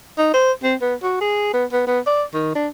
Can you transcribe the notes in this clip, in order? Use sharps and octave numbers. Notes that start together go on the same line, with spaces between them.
D#4
C5
C4
B3
F#4
G#4
B3
B3
B3
D5
D#3
D4